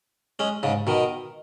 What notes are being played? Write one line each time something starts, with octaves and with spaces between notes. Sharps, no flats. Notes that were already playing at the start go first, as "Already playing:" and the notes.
G#3 C#4
G#2 C#3
B2 D#3